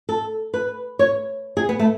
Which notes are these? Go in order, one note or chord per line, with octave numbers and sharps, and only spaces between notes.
A4
B4
C#5
G#4
B3
A3